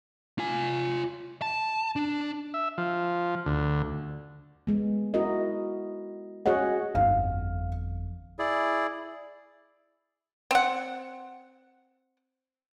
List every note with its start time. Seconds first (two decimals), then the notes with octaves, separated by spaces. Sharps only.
0.39 F4 G#5
1.42 A5
1.96 D4
2.54 E5
2.78 F3
3.46 D2
4.67 G#3 B3
5.14 E4 F#4 A#4 D#5
6.46 F#4 G#4 C#5 D#5 F#5
6.95 G1 F2 F5
8.39 E4 G#4 D5
10.51 C4 F#5